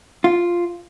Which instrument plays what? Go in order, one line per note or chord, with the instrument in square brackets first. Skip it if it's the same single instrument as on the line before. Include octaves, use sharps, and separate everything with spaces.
[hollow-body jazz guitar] F4